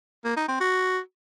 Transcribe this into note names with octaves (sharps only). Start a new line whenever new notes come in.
A#3
D#4
C4
F#4